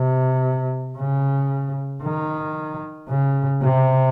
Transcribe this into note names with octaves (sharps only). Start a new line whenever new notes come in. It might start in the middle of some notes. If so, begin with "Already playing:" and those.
Already playing: C3
C#3
D#3
C#3
C3